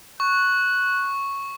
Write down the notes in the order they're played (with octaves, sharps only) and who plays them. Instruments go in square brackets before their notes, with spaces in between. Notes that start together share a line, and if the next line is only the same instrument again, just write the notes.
[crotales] C#6 [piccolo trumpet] F#6